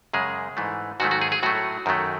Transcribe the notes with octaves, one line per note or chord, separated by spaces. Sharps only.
F#2 C#3 G#3 G#4
G#2 E3 A3
G#2 D#3 F#3 A3 F#4
F#4
G#4
G#4
A2 F#3 A3 F#4
F#2 D#3 F#3 A3